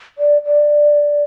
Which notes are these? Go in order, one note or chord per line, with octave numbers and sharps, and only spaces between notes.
D5
D5